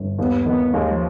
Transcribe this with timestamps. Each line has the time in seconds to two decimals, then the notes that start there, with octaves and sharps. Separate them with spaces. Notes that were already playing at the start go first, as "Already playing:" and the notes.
Already playing: G1
0.18 D#2 B3
0.46 D#3 B3
0.74 D#2 G#3
0.91 F3